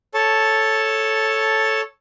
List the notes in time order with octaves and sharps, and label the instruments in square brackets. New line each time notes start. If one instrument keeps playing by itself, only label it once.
[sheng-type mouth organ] A4 C#5 A5